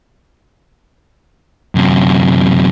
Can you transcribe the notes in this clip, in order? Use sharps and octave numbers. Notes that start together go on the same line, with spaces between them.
F#2 C3